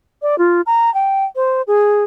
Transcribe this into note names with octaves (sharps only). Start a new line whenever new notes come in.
D5
F4
A#5
G5
C5
G#4